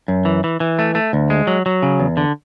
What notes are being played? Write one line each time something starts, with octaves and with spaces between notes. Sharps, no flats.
F#2
E3
E3
E3
A3
A3
D2
G#3
F#3
F#3
C#3
E2
D3